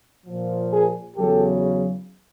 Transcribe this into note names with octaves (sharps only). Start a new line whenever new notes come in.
A#2 F3
G#4 A#4
E2 C#3 F#3 G4 A4